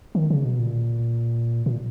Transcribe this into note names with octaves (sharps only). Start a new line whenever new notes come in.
D#3
C#3
B2
A#2
A#2